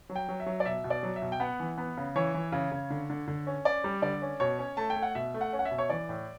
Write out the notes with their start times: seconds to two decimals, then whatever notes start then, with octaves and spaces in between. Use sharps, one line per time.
0.10 F#3
0.16 G5
0.29 F#3
0.40 E5
0.46 F#3
0.60 D5
0.66 B2 E5
0.84 B2
0.90 D5
1.03 F#3
1.16 E5
1.22 B2
1.32 G5
1.40 B3 F#5
1.60 E3
1.78 B3
1.97 C#3
2.16 E3 C#5
2.34 E3
2.52 C#3
2.72 C#3
2.90 D3
3.10 D3
3.27 D3
3.47 C#4
3.65 C#4 D5
3.84 G3
4.02 D3 D5
4.22 C#4
4.40 B2 C#5
4.58 C#4
4.77 A3 A5
4.90 G5
4.96 A3
5.03 F#5
5.15 B2 E5
5.34 A3
5.41 F#5
5.53 C#4
5.59 F#5
5.65 E5
5.71 B2
5.78 C#5
5.90 E3 D5
6.09 A2